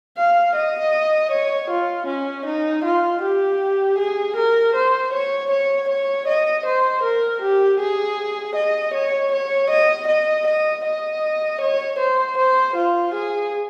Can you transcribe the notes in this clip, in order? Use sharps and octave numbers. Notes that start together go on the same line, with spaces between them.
F5
D#5
C#5
F4
C#4
D#4
F4
G4
G#4
A#4
C5
C#5
C#5
C#5
D#5
C5
A#4
G4
G#4
D#5
C#5
C#5
D#5
D#5
D#5
D#5
C#5
C5
C5
F4
G#4